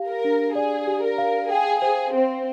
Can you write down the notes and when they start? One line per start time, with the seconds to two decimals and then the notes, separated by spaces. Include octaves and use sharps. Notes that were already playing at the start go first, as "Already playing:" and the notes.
Already playing: G4 F5
0.09 A#4
0.25 D4
0.55 G#4 D5
0.87 G4
1.03 A#4
1.18 F5
1.51 G#4 G5
1.82 G#4 C5
2.13 C4 C5